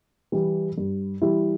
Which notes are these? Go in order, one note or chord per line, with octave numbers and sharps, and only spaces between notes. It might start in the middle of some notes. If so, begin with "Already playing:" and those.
E3 G3 E4 G4
G2
E3 G3 E4 G4